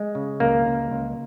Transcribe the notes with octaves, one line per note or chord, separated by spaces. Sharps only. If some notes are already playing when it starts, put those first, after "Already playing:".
Already playing: G#3
C#3
C#2 A#3
C#2
C#2